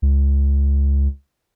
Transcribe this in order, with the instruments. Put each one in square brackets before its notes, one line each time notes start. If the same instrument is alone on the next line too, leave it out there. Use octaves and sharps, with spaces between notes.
[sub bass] C#2